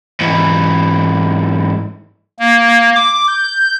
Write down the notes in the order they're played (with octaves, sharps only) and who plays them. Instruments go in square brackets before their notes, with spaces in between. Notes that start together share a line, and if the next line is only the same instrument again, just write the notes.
[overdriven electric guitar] G#2 E3
[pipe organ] A#3
D6
G6